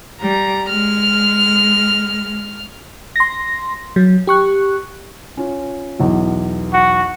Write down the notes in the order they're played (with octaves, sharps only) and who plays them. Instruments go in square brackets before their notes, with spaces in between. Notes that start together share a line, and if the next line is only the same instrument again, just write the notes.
[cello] G3 [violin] A#5
[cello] G#3 [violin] F6
[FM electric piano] C6 A#6
F#3
G4 C#6 F#6
[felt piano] C#4 F4
B1 E2
[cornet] F#4